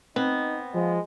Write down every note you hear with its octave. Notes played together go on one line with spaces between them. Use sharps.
B3 C4 D#4
F3 G#3